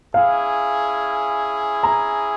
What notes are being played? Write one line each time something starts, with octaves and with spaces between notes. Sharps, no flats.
C#4 E4 G#4 F5
A#5